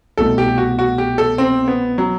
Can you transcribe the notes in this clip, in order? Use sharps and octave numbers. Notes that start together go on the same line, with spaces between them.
C2 B2 A3 A4
G4
F#4
F#4
G4
A4
C4
B3
F#3